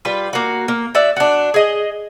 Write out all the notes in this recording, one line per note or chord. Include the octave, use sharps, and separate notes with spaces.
G3 F4 B4
A#3 F#4
A#3
F#4 D5 E5
D4 F#4
G#4 D#5